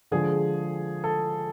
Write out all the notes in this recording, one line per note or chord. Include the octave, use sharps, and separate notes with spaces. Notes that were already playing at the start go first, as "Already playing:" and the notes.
D3 F3 G#3 G#4
A4